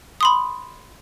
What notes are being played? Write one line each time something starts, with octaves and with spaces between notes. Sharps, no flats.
B5 C6 D#6